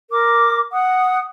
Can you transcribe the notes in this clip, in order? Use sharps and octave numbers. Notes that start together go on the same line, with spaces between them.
A#4 D6
F#5 D#6